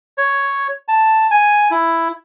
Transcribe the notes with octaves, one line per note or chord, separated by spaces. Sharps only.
C#5
A5
G#5
E4